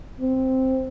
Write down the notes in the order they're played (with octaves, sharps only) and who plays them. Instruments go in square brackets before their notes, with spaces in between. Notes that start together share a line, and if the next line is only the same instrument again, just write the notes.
[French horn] C4